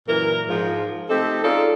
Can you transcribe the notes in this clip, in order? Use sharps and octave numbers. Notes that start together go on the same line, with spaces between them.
F#2 A#2 E3 A#4
G#2 F3
A3 C4 D#4 G4 A4
C#4 D#4 F4 G#4 A4 D5